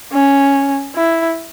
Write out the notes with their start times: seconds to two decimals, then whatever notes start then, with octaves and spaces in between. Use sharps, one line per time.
0.12 C#4
0.96 E4